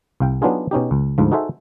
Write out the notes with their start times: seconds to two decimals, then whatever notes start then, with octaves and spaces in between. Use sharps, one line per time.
0.20 C2 F5 G5
0.42 F#3 B3 D4 D#4 F4 G#4
0.71 B2 C#4 D#4 G4
0.91 C#2
1.18 D2 G#2 F3
1.32 D#4 F#4 G#4 A4 C5 E5